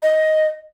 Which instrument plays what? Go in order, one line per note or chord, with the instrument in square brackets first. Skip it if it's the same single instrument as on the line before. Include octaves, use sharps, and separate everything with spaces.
[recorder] D#5